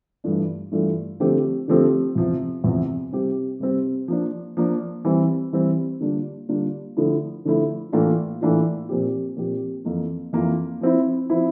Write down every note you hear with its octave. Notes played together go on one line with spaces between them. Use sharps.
G2 E3 A3 D4 F4
G2 E3 A3 D4 F4
D3 F3 A3 C4 G4
D3 F3 A3 C4 G4
E2 C3 F3
E2 C3 F3
C3 G3 C4 G4
C3 G3 C4 G4
F3 A#3 D4
F3 A#3 D4
E3 G3 C4
E3 G3 C4
D3 G3 A#3 D4 F4
D3 G3 A#3 D4 F4
D3 F3 A3 E4
D3 F3 A3 E4
A2 E3 A#3 D4 F4
A2 E3 A#3 D4 F4
A#2 F3 C4 G4
A#2 F3 C4 G4
F2 E3 A#3 F4
F2 E3 A#3 F4
F3 C4 E4
F3 C4 E4